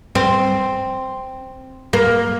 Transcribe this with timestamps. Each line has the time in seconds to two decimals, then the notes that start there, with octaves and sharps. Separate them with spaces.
0.15 C4
1.93 A#3